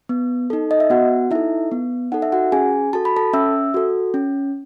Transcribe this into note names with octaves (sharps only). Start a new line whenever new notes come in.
B3
D#4 A4
D#5
E5
B3 F#4 F#5
D#4 E4 A4 E5
B3
D#4 A4 F#5
E5
F#4 F#5
C#4 G#4 G#5
F#4 A4 A5
B5
A4 A5
C#4 E5 E6
F#4 A4
C#4